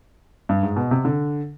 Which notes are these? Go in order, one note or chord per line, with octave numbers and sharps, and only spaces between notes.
G2
G#2
B2
C3
D3